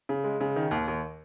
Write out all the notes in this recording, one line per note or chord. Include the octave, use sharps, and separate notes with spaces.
C#3
G#3
C#3
D#3
D#2
D#2